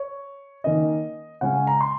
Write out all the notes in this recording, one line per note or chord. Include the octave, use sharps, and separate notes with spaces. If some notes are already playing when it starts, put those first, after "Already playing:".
Already playing: C#5
D#3 A#3 C#4 D#5
C#3 G#3 C#4 F#5
G#5
A#5
C6